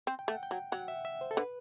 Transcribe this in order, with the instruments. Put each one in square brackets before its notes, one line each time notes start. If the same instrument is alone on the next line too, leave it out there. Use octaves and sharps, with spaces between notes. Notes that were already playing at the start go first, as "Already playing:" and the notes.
[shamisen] C4
[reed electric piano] G5
[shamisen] A3
[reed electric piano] F#5
G5
[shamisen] F#3
[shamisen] F#3 [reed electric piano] F#5
[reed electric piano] E5
E5
C5
A4
[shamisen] D3 [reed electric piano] B4